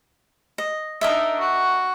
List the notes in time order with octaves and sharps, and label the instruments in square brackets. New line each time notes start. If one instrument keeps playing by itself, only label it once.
[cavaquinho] D#5
[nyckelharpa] D4 D#4 [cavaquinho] A#4 D#5 E5
[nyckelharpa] F#4